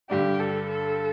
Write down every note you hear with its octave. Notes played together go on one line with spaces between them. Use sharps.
G2 D3 G3 D4 G4
A4
A4